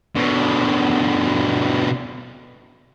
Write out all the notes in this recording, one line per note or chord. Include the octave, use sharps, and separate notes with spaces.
B2 D3